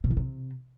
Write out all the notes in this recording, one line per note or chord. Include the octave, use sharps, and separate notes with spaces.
B2
E3
C3